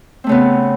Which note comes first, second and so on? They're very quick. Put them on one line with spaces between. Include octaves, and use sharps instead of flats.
C4 A3 C#3 B3